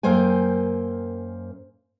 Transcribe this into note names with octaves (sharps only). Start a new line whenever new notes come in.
F#2 A#3 C5 G5 G#5